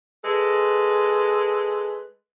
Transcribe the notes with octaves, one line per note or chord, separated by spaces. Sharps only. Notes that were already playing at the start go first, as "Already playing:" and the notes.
G#3 A4 B4